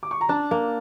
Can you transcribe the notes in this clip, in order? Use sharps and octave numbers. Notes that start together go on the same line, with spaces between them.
D6
C#6
A#5
D4 A5
A#3